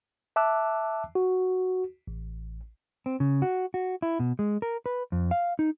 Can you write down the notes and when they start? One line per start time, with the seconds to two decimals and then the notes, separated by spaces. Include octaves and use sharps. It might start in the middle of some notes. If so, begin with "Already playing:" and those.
0.36 E5 A5 D6 E6 F#6
1.15 F#4
2.08 A1
3.06 C4
3.20 C#3
3.42 F#4
3.74 F#4
4.02 E4
4.20 B2
4.39 G#3
4.62 A#4
4.86 B4
5.12 F2
5.31 F5
5.59 D#4